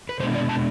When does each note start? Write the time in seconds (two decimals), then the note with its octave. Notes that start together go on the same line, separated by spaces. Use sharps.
0.09 B4
0.20 B2 G#3 B3 D4 C5
0.35 D5
0.49 A5